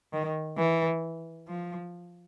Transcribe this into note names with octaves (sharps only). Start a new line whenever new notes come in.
D#3
E3
F3